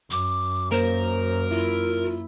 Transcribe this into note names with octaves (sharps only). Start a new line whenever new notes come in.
F#2 D6
A#3 A#4 C5
E4 F4